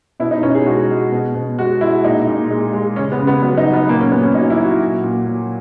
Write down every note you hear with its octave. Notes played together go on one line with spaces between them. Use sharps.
B2 E4
D#4
B2 C#4
G#4
G#3 F#4
G#3
B2
B2
G#3 F#4
G#3 E4
A#2 D#4
A#2
G#3
G#3
C#3 C#4
B3
C#3
B3
F#3 B3
D#4
F#3
B3
A#2 A#3
C#4
A#2 B3
C#4
F#3 D#4
E4
F#3
F#4
A#2
A#2
F#3